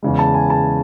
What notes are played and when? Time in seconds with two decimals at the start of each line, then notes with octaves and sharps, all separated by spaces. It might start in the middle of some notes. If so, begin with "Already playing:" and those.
0.03 E2 C#3 G#3
0.19 A5
0.34 G#5
0.50 A5